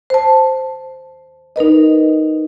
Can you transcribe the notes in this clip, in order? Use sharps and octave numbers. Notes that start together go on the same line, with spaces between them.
C5 A5
D#4 A#4 B4 D#5